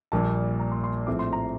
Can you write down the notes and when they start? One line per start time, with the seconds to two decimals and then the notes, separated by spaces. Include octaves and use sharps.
0.12 A#1 A#2 G3 A#3 A5
0.60 A#5
0.72 C6
0.84 C6
1.07 A#1 A2 F3 C4 D6
1.19 C6
1.33 A#5